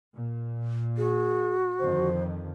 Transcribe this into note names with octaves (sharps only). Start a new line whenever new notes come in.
A#2
F#4 G#4
F2 D3 D#3 C5